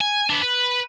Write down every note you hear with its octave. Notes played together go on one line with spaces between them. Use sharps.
G#5
B3 D4
B4